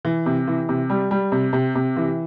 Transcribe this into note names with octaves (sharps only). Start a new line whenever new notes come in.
E3
C3
E3
C3
G3
G3
C3
C3
C3
E3